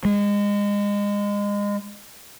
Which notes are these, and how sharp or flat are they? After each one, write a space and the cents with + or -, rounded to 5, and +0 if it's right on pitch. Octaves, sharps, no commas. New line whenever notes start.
G#3 -25